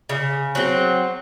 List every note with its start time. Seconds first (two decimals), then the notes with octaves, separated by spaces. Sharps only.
0.09 C#3
0.55 F#3 C4